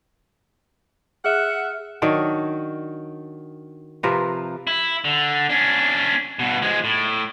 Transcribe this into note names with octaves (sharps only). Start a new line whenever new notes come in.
G#4 E5 F#5 F6 F#6
D#3 F#3 D4 C#5
C3 F3 A#4 B4
E4
D3
C#4 D4
G2 B2
F3 G#3
A2